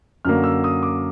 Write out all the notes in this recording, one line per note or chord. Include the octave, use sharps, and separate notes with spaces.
F#2 D3 F#3 A#3 F6
E6
D#6
D6